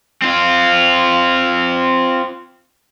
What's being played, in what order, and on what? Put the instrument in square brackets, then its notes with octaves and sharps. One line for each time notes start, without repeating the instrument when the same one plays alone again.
[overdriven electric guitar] C4 F4